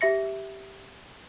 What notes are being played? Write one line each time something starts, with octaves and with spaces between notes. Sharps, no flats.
G4 E5 A#6 C#7